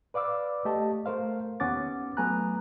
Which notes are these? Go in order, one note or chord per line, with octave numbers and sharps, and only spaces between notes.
B4 D5 F5 D6 E6
A3 G4 D#5 A5
A3 A#4 C5 F5
D#2 B3 C#4 F#5 D6 A6
F#3 A3 B3 G#5 A#5 F#6